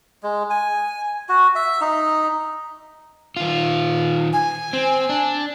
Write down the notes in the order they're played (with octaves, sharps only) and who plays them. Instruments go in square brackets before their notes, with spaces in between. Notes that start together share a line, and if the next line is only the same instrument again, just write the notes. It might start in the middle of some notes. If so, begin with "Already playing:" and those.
[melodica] G#3
G#5
F#4
E5
D#4
[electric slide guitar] D#3 F4
[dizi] G#5
[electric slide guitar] C4
D4